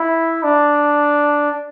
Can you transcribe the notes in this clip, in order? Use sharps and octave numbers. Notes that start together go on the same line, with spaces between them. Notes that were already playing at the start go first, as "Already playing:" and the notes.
Already playing: E4
D4